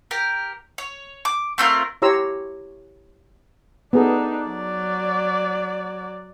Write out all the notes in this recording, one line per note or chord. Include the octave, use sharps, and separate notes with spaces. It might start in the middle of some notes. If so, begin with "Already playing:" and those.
G4 A#4
C#5
D6
A3 C4 F4 A#4
E4 G4 C#5 A#5 C6 E6
B3 D4 D#4 G#4 A4
F#3 D5